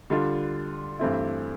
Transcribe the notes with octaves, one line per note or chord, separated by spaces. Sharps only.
D3 G3 D4 F4
G2 E3 A3 C4 E4